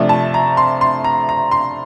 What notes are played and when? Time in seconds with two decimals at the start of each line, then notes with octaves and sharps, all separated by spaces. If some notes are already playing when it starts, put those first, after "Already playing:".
Already playing: C3 F3 A3 D4
0.09 A5
0.34 A#5
0.57 C6
0.81 C6
1.04 A#5
1.29 A#5
1.51 C6